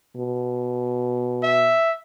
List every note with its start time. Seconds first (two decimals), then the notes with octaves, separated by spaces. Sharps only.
0.17 B2
1.43 E5